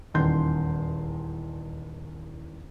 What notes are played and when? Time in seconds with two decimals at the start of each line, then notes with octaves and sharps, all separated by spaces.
0.14 D#1 E2 D#3 C6 G6